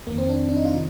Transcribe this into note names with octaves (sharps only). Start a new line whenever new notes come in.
F2 D#3 A#3
C4
D4
D4
D#4
F4
C3 D#3 D#4